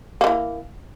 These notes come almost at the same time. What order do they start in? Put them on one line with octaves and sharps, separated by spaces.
A#3 D3 E3